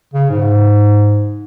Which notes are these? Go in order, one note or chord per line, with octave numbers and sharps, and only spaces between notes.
C#3
G#2